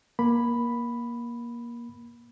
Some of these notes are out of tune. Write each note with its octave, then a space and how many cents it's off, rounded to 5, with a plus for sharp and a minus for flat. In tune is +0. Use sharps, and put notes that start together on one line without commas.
A#3 +20 B5 +0